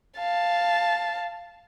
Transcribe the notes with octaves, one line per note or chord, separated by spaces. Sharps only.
F5 A5